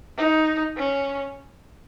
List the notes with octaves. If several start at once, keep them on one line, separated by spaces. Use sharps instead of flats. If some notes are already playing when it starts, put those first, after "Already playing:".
D#4
C#4